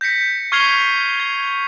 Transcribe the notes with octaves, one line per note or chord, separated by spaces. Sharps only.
G6 A#6 B6 C#7
C#6 F6 G#6 C7 F7 G7
G#6